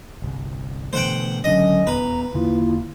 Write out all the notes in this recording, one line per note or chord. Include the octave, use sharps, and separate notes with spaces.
G1 C2
B2 D3 E3 A3 C5 F#5 G5
G#1 C#2 D3 F#3 C#4 D4 D#5
D#1 E2 B3 B4 A#5
E2 D3 D#3 A#3 E4 F4